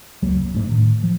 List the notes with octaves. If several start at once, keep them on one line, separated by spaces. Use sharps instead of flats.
E1 C#2 F#3 A#3
F1
F2 G#2 A3 D4
A2 D#3
F3